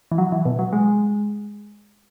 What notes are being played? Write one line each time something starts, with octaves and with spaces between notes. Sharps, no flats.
E3
F#3
E3
B2
F#3
G#3